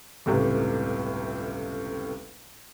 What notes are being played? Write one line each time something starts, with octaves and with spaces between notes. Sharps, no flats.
G1 C#2 A2 C3